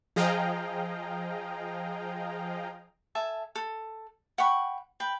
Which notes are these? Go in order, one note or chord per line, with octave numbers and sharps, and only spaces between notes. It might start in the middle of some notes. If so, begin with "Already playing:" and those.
F3 G#4 D#5 F5 G5 A#5
A4 E5 G#5 A5
A4
F#5 G5 B5 C#6
B4 G5